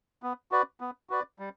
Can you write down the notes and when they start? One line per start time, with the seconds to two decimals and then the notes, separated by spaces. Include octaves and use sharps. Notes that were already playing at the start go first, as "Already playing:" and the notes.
0.23 B3
0.51 F#4 B4 D5
0.80 B3
1.10 F#4 B4 D5
1.39 G3